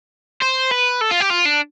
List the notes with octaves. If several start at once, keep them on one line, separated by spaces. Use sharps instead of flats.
C5
B4
A4
F4
G4
F4
D4